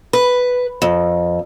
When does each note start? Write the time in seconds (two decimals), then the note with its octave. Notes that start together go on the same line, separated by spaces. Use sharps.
0.13 B4
0.82 F2